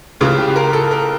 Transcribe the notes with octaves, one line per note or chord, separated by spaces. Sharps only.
C#2 C#3 E3 F4
G4
A#4
A4
A#4